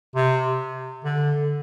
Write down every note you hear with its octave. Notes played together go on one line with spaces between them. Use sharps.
C3
D3